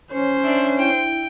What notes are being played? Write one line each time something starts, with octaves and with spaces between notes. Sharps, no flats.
C#4 C5 C#5
D4 E5
E4 G5